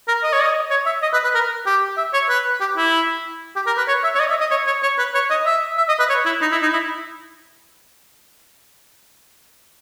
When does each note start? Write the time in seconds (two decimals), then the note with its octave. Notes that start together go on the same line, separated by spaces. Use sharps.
0.08 A#4
0.23 D#5
0.33 C#5
0.42 D#5
0.71 C#5
0.86 E5
1.02 D#5
1.13 B4
1.24 B4
1.35 A#4
1.66 G4
1.98 E5
2.14 C#5
2.29 B4
2.61 G4
2.77 E4
3.56 G4
3.67 A#4
3.77 B4
3.88 C#5
4.04 E5
4.15 C#5
4.20 D#5
4.30 E5
4.40 D#5
4.51 C#5
4.67 C#5
4.83 C#5
4.98 B4
5.14 C#5
5.30 D#5
5.46 E5
5.78 E5
5.89 D#5
5.99 B4
6.09 C#5
6.25 E4
6.42 D#4
6.52 E4
6.62 D#4
6.73 E4